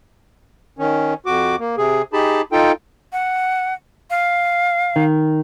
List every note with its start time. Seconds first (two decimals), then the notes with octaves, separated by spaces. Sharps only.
0.79 D#3 C#4
1.26 F2 F#4 D6
1.59 A#3
1.78 C3 G#4
2.13 D#4 G4 G#4 A5 B5
2.52 D#4 F4 A4 G5
3.12 F#5
4.10 F5
4.96 D#3